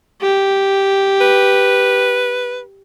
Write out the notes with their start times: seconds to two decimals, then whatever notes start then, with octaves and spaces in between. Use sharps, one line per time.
0.22 G4
1.21 B4